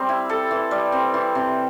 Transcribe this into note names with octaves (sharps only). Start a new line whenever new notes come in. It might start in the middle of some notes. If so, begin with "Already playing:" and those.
Already playing: G3 C4
E4
A4
E3
G3
C4
E3
C3